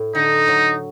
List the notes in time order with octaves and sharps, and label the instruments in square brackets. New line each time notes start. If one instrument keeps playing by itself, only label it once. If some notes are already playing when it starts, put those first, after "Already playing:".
Already playing: [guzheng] A2 A4
[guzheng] D3 [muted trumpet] D#4
[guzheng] F#3